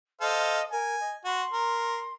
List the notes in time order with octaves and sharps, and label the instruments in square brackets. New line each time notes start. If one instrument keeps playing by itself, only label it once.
[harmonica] A4 C5 F5 [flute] D#5
[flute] A#4 [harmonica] G#5
[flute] D#5
[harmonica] F#4 [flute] C6
[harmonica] A#4